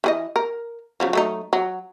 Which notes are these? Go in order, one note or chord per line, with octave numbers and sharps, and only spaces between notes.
E3 G#4 D#5
A#4
C#3 F3 F#3
F#3 A3 D#4
F#3